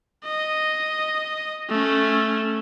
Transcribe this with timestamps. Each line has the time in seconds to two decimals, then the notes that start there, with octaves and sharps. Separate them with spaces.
0.25 D#5
1.70 A3 C#4